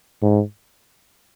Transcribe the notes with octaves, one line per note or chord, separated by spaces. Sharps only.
G#2